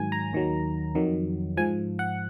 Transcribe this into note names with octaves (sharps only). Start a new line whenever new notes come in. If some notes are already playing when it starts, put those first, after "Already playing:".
Already playing: G#2 D#3 F#3 G#5
A#5
D#2 D#3 F#3
F2 D#3 F#3
G#2 F3 G#5
F#5